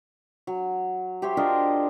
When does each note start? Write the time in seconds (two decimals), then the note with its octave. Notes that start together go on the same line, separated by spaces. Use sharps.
0.47 F#3
1.22 G4 C5 C#5 E5
1.37 D4 F4 A#4 D#5